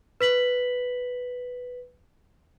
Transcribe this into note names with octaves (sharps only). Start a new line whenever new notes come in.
B4 B6 F#7